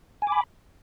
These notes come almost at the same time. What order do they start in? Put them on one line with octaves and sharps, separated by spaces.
G#5 D6 B5